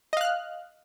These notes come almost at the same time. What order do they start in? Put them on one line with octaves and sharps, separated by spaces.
D#5 F5 F#6 F6